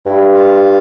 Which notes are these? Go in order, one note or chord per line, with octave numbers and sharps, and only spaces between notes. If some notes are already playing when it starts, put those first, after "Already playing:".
G2 E4
F4